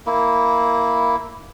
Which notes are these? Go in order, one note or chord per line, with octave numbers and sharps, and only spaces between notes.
A#3 E4